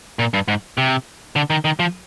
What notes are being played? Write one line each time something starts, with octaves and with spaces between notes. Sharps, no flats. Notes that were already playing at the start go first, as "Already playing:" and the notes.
A#2
G2
G#2
C3
D3
D#3
D#3
F3